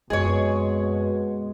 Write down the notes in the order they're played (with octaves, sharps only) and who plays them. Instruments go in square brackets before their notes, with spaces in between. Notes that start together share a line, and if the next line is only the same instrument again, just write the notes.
[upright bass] F#2 C4 [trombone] B2 [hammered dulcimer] G#3 [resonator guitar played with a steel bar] G#4 C#5